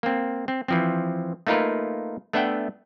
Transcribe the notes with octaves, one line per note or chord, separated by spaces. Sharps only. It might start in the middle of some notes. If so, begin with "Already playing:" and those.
A#3 C4
C4
E3 F3 C4
A3 A#3 D#4 F4 A#4 B4
A3 B3 D4 E5 F#5 G5